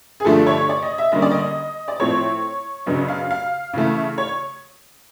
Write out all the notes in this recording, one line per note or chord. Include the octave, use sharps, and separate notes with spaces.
G#4
G2 D3 F3 A3 D4 A4
C#5
D5
D#5
E5
D3 G3 A#3 C#4 D#5
D5
D#5
D5
A2 F3 A3 C4 C#5
F#2 C#3 F#3 B3 D4 D#5
F5
F5
C#3 E3 A3
C#5